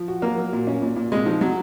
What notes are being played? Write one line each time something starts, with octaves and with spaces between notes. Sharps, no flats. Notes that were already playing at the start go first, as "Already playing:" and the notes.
Already playing: F3
F#4
F#3 A#3
F#3
A#2
C#4
A#2
A#2
C3 G#3
F3 D#4
C3 F#3